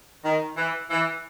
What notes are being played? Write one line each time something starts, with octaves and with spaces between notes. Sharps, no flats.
D#3
E3
E3